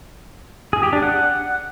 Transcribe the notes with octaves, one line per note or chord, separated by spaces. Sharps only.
G#4
G4
D4
F#5